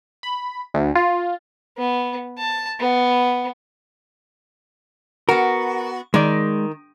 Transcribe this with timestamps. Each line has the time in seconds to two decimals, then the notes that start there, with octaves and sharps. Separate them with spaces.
0.23 B5
0.74 D2
0.96 F4
1.78 B3
2.38 A5
2.80 B3
5.29 B3 F#4 A#4
6.14 D#3 G#3 D5